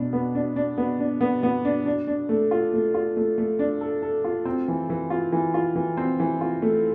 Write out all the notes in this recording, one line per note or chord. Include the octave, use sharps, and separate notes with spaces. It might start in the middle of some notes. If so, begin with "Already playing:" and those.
Already playing: B2 D4
B3
D4
D4
B3
D4
B3
B3
D4
D4
D4
A3
F4
A3
F4
A3
A3
D4
A4
A4
F4
C4
E3
E3
F4
E3
F4
E3
C4
E3
F4
A3